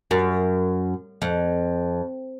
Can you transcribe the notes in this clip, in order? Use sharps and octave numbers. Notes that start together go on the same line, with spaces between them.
F#2
F2